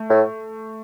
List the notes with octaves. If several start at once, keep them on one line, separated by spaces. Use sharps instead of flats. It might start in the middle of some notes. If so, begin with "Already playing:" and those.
Already playing: A3
A2